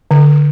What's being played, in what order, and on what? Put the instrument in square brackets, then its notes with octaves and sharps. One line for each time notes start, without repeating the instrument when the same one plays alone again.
[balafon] D3